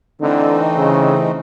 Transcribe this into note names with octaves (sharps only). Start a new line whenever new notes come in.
D3 E3 A3 C4 D#4
C#3